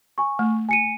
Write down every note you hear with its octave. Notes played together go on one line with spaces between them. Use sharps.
G#5 C#6
A3
G#5 C#7 D#7